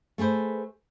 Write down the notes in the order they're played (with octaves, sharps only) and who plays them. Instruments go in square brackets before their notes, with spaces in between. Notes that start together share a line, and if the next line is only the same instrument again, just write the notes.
[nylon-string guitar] A3 G#4 B4 C5